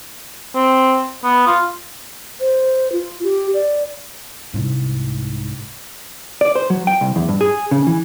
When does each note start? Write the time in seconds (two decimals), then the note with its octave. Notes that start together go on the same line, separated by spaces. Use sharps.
0.55 C4
1.24 B3
1.47 F4
2.40 C5
2.92 F4
3.24 G4
3.54 D5
4.53 C2 G#2
6.41 D5
6.55 C5
6.70 F#3
6.87 G5
7.01 C2
7.16 E2
7.29 G2
7.41 G#4
7.71 C#3
7.87 E3